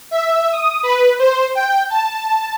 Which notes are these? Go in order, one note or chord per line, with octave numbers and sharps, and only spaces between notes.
E5
D#6
B4
C5
G5
A5